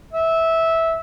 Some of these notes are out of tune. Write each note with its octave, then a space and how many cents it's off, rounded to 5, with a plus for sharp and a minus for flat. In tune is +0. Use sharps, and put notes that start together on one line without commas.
E5 -15